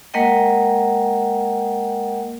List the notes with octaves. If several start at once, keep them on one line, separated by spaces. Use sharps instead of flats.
G#3 A#3 A#4 D#5 F#5 G5